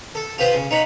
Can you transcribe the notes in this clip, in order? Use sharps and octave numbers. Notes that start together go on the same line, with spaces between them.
A4
F4 G4 B4 C5 D#6
C#3
D#4 C#5 F#5 B5